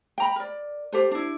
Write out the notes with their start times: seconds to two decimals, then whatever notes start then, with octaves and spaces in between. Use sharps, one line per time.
0.18 G5 A#5 B5
0.36 A#4 D5
0.93 G4 A4 C5
1.11 D4 E4